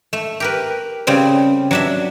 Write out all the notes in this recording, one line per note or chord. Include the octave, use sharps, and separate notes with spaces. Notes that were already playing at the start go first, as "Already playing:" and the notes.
A3
G4 A#4 B4
C#3 G3 C4
F#3 D4 E5